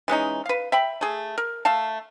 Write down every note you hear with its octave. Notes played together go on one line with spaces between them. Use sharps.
E3 G#3 C#4 D#4
B4 F5
E5 G5 B5
A3 G#4
A#4
A3 F5 A5